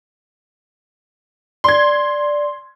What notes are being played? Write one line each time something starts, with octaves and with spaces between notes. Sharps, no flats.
D5 C6 G#6